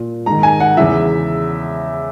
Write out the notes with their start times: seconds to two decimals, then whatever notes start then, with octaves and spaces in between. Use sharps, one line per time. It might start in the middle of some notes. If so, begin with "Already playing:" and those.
Already playing: A#2
0.26 G#2 D#3 A#5
0.43 G#5
0.60 F#5
0.77 E2 C#3 E3 E5